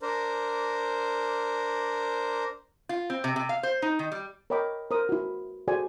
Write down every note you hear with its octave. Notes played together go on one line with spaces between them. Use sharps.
D4 A#4 C5
F4
C4
C3
C3
F5
C5
D#4
D#3
G3
A#4 C#5 D#5 G5 B5 D6
A#4 C5 D#6
E4 F#4
F#4 G#4 A4 C5 D5 G#5